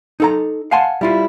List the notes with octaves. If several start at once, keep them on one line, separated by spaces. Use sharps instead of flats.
D#4 A4 A#5
F5 F#5 G#5 A5 C6
G3 E4 F4